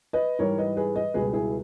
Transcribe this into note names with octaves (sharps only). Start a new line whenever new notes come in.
B4 D#5
G#2 E3 G3 A#4 C#5
B4 D#5
G#4 B4
B4 D#5
C#2 B2 G3 G#4 B4
E4 G#4